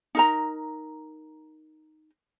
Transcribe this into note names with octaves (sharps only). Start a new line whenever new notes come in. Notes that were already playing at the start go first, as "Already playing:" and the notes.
D#4 A#4 A#5